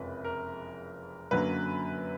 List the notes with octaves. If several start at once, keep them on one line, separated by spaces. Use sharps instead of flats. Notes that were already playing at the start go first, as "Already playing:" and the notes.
Already playing: F#1 F2 C3 G#3 B4
A#4
F#2 D3 F#3 A#3 B4